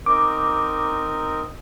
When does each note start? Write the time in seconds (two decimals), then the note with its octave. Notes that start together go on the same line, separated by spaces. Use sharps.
0.06 C4 D#4 A#4 D6